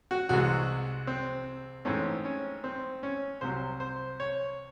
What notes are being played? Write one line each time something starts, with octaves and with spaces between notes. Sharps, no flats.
F#4
C2 C3 E3 G#3 F#4
C4
G#2 E3 A3 C4 C#4
C#4
C4
C#4
C2 C3 F#3 C4 C5
C5
C#5